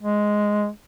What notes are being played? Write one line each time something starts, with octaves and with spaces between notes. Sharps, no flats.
G#3